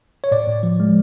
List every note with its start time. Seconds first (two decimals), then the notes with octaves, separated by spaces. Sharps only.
0.24 C#5
0.31 A2 D5
0.47 A2
0.63 F3
0.80 G#3